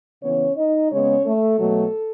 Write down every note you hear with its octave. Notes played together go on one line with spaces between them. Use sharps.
C#3 E3 B3 C#4 C#5
D#4 D#5
C#3 G#3 B3 C#4 C#5
A3 A4
B2 F#3 A3